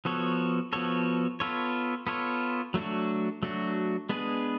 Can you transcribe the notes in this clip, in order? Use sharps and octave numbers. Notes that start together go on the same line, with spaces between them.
F3 B3 F#4 A4 C#5
F3 B3 F#4 A4 C#5
B3 F4 A4 C#5
B3 F4 A4 C#5
F#3 A3 D4 F#4
F#3 A3 D4 F#4
G#3 B3 D4 G#4 B4